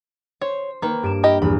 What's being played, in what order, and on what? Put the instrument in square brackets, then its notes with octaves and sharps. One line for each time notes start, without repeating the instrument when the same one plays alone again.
[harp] C5 [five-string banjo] C#5
[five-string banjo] D#3 B4 [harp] A#3
[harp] G2 D7 E7
[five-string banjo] E4 G4 D#5 [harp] A#4
[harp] A#1 E2 G2 [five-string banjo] B5